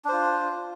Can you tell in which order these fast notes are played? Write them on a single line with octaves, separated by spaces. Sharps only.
D4 C5 F4